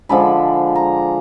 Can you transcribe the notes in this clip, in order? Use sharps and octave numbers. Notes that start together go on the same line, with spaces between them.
D3 F3 G#3 D4 B5
A#5